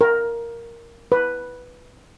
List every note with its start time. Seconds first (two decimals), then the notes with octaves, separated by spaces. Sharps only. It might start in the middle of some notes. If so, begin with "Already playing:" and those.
0.01 A#4
1.12 B4